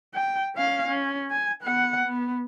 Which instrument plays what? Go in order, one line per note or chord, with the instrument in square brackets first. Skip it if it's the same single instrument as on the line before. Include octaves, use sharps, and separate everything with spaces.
[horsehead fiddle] G5
C#4 F5
C#4
G#5
B3 F#5
B3